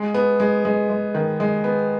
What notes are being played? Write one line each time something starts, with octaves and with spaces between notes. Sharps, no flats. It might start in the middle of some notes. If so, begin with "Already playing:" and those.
Already playing: G#3
B3
G#3
G#3
G#3
D#3
G#3
B3